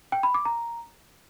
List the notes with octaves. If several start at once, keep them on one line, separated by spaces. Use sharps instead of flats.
G5
B5
D6
A#5